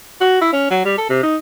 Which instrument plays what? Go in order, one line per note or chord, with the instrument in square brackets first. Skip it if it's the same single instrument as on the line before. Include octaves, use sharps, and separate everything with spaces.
[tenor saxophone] F#4
E4
C#4
F#3
G3
A4
C3
D#4